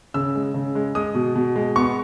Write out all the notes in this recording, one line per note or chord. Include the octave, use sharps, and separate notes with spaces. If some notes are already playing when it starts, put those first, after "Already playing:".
C#3 E6
G#3
C#3
G#3
G#3 D#6
B2
B2
G#3
B3 C#6